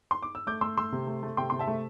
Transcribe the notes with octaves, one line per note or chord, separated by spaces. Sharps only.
C6
D6
E6
A3 D6 G6
A3 C6 E6
A3 C6 E6
C3
A3
A3
C3 G5 C6
C3 C6
E5 A5
A3